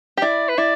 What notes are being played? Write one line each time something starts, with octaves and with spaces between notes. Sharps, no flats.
G4
E4 D5
B4
E4 D5